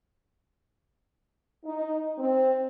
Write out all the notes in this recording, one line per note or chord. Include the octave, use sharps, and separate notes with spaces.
D#4
C4